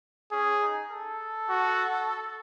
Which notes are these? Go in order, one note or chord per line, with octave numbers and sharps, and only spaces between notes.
C#4 G#4
D#4
A4
F#4